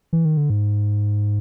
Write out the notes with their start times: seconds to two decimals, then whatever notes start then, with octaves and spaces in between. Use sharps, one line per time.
0.13 E3
0.25 D#3
0.37 D3
0.50 G#2